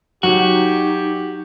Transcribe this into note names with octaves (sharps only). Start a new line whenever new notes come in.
F#3 D#4 F#4 G4